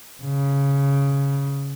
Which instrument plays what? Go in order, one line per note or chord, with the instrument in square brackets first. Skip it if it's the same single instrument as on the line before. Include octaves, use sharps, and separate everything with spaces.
[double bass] C#3